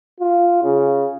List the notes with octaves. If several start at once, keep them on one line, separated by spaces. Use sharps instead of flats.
F4
C#3